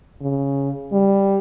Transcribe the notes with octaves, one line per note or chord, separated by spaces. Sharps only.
C#3
G3